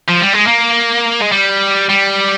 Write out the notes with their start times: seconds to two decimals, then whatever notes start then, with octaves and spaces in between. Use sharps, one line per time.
0.09 F3
0.22 G3
0.34 G#3
0.47 A#3
1.22 G#3
1.32 G3
1.90 G3